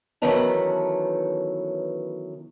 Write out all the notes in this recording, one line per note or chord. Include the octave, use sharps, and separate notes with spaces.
D#3 E3 F#3 B3 C#4 A4